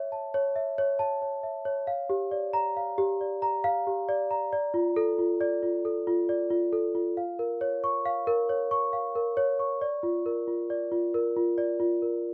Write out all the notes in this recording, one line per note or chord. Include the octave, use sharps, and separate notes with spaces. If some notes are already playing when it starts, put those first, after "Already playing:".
Already playing: C#5 E5
A5
C#5
E5
C#5
A5
C#5
E5
C#5
F5
G4
D5
A#5
F5
G4
D5
A#5
F5
G4
D5
A#5
D5
F4
A4
F4
D5
F4
A4
F4
D5
F4
A4
F4
F5
A#4
C#5
C#6
F5
A#4
C#5
C#6
F5
A#4
C#5
C#6
D5
F4
A#4
F4
D5
F4
A#4
F4
D5
F4
A#4